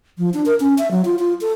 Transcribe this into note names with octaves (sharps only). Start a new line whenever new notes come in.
F3
D4
A#4
C#4
E5
F#3
F4
F4
A4